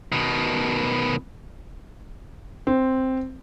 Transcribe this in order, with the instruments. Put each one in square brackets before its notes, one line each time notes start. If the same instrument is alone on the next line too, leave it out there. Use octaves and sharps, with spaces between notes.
[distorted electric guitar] B2 D#3
[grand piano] C4